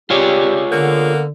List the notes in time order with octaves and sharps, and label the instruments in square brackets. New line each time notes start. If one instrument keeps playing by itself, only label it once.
[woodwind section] G3 C4 G4 [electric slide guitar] F4 G#4 C#5
[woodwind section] D3 [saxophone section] A#3 B3